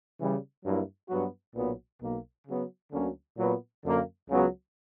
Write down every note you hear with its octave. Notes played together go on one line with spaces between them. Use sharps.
C#3 E3 G3
G2 F#3 A#3 E4
G2 F#3 B3 F#4
B1 A#2 F#3 B3
B1 B2 A#3
C#3 F#3 B3
D2 D3 F#3 A#3 C#4
A#2 F#3 B3 F#4
F#2 D3 A#3
C#2 C#3 F#3 B3